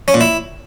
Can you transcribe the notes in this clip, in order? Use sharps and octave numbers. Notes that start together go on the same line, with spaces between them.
C#4
A#2
E4